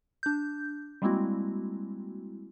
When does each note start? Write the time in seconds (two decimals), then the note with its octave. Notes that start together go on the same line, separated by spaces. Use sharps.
0.23 D4 G6
1.02 G3 G#3 A#3 C4 E4 F#4